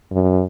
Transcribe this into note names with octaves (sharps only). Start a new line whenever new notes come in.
F#2